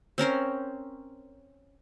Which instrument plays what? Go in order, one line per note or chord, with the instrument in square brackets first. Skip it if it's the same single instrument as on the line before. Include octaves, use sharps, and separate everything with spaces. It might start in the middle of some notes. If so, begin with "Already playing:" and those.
[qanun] C4 C#4 A#4 C5